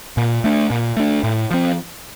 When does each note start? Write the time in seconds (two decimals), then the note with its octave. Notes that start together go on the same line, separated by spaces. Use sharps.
0.17 A#2
0.44 A3 D4
0.70 A#2
0.97 A3 D4
1.23 A2
1.51 F3 C4